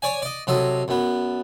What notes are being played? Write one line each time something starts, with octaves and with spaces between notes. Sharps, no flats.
C#5 D5 G#5
D5 D#5
C3 F#3 A4 D#5
F#2 B3